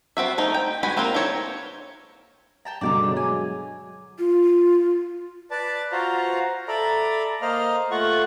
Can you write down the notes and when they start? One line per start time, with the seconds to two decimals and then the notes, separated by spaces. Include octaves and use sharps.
0.17 B3 C4 F#4 E5
0.38 F3 A3 D#4
0.54 G5
0.83 G#3 F#4 B4 G#5 B5
0.97 A#3 C4 D4 F4 A#4
1.14 D#4 E4 C5 C#5
2.65 G5 A5 A#5
2.81 G2 B2 D3 D5 G5 A#5
3.03 F#3 G#3 A3
3.17 G#5
4.19 F4
5.51 B4 D5 A5
5.92 F4 F#4 C5 F5 A#5
6.68 A4 D5 E5 A#5 B5 D6
7.42 A#3 C5 D#5 F5 A#5 F6
7.91 A3 F4 F#5 C#6